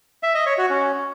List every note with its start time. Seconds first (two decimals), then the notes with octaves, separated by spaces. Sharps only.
0.23 E5
0.35 D#5
0.46 C#5
0.58 F#4
0.70 C#4